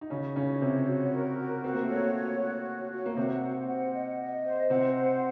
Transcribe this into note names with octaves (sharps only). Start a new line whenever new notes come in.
D#4
C#3 C#4 F#4
C#3 C#4 C#5
C3 C4 C#5
F#4
A#4
F#4
C4 F#4
A#3
A3
A#3 C#5
F#4
F#4
C#5
F#4
A#3
C3 C4 F#5
C5
F#5
D#5
D#5
C5
C3 C4 F#5
C5